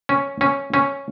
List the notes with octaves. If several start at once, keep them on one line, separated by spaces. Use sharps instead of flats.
C#4
C#4
C#4